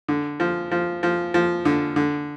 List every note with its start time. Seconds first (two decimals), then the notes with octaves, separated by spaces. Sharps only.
0.08 D3
0.40 F3
0.71 F3
1.03 F3
1.34 F3
1.65 D3
1.96 D3